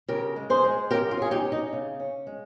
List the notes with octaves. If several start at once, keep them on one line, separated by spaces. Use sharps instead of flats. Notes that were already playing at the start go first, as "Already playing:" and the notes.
C#3 G4 A#4
G#3
G#4 C5
G#3
C#3 G4 A#4
F4
C#4 G#4
D#4 G4
C#4
D#4
C#3
C#4
G#3